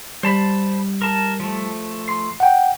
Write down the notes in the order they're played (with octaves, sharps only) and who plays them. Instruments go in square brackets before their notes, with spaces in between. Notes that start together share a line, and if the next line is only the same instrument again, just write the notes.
[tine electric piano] G3 [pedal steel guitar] C5 A5 B5
[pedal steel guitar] A#4 A5
F3 A3
[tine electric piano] C6 C7
F#5 G5